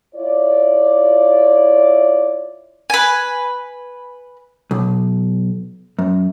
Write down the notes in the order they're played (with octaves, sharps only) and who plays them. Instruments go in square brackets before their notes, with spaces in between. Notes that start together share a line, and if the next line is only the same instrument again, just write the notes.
[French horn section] E4 F4 C#5 D5
[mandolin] B4 G#5
[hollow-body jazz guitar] B1
F#2